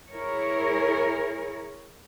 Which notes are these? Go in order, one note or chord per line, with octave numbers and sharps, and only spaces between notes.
E4 G#4 A#4 C#5